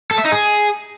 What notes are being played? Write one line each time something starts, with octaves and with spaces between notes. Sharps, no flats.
A4
E5
D#4
G#4